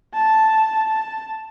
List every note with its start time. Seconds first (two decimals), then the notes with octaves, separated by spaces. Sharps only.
0.14 A5
0.88 A5